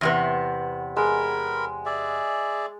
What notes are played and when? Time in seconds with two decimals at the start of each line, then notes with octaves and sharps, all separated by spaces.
0.01 E2 C3 B3
0.97 G#3 A#4 B5
1.86 G#4 D5 E5